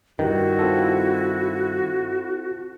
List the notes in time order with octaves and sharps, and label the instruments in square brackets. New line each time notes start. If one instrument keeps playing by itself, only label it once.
[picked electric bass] G2 D#3 [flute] E4 [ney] F#4
[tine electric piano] C4 F4 A4